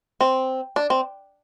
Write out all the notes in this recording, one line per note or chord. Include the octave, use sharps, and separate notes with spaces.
C4
D4
C4